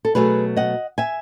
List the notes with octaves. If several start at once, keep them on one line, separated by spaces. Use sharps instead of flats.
A4
B2 F#3 A3 G#4 B4
D#5 F#5
E5 G#5